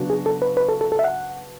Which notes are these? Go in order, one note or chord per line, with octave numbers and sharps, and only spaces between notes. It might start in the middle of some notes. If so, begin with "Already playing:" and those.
Already playing: C#3 F#3 B3 D4 F#4
G#4
A4
B4
B4
A4
A4
A4
E5
F#5